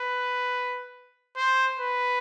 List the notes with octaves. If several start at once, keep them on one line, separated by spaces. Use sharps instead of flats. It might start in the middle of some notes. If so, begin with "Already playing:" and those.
Already playing: B4
C5
B4